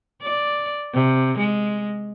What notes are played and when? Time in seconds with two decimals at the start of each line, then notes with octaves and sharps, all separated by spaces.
0.23 D5
0.94 C3
1.38 G#3